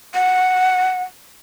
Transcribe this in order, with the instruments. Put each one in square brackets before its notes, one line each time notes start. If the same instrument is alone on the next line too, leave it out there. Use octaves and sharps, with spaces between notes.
[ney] F#5